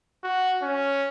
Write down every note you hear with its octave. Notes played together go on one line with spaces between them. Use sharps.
F#4
C#4